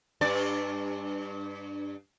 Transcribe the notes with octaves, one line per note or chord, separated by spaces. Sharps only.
G2 D4 D5